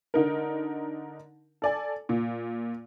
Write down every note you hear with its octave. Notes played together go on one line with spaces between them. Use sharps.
D3 D#4 A#4
A4 D5 G#5
A#2